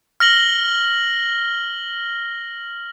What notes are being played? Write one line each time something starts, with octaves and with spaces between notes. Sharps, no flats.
F6 A#6 F#7 G7